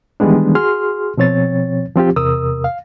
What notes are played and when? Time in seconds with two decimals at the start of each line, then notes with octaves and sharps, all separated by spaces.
0.20 D#3 E3 G3 G#3 B3 D4
0.55 F#4 G#4 C6 F6
1.17 B2 F3 C4 C#5 A6
1.96 F3 C4 F4 G4
2.16 E2 C3 A#4 D#6 E6
2.64 F5